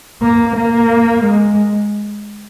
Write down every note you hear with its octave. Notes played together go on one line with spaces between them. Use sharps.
A#3
A#3
G#3